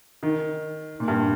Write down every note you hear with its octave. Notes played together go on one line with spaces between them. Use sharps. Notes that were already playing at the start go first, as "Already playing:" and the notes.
D#3
A#2
G2